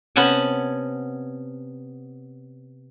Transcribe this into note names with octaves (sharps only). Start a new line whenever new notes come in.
C3 B3 C#4 F#5 G#5 A5